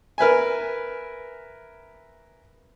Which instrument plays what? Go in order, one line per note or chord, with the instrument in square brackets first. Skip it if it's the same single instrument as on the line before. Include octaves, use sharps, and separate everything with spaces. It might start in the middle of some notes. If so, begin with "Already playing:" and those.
[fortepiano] A#4 B4 E5 G#5